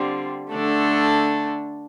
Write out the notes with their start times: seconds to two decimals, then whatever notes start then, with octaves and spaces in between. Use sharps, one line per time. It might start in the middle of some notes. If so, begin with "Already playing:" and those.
Already playing: D3 G3 C4 F4
0.52 D3 A3 D4 A4